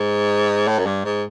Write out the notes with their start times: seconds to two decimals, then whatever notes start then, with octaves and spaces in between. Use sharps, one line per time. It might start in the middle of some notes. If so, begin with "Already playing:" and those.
Already playing: G#2
0.67 A2
0.79 F#2
0.86 G2
1.04 G#2